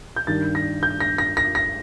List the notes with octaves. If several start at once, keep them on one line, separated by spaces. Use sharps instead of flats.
G6
G2 D#3 G3 D4 A6
A#6
G6
A#6
A#6
A#6
A#6